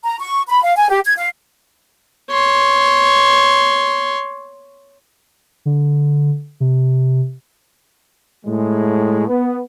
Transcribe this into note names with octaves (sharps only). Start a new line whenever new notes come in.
A#5
C#6
B5
F5
G#5
G4
G#6
F5
C#5 C6
D3
C3
A2 G#3
B3